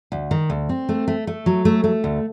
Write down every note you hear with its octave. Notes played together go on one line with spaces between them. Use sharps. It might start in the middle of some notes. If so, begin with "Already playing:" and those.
D2
D#3
D2
C4
A3
A3
A3
F#3
A3
A3
D2